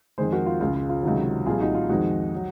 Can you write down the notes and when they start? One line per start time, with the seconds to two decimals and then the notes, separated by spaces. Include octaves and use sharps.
0.18 F2 D#3 G#3 G#4 C5
0.32 F#4 A#4
0.46 F4
0.60 C#2 C#3 G#3 F4
0.75 F4
0.89 F4
1.03 C#2 C3 D#3 F#3
1.46 C2 A#2 F3 F4 G#4
1.60 D#4 F#4
1.75 F4
1.89 F2 D#3 G#3 D#4 F#4
2.36 F#3